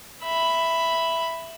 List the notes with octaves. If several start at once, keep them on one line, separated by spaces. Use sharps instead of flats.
E5 B5